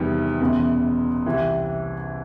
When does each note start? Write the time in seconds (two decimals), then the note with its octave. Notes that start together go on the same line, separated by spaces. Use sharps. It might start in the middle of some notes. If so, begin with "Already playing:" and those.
Already playing: E2 C3 D#3 G3 B3
0.41 F#1 E2 B2
1.26 C2 C3 E3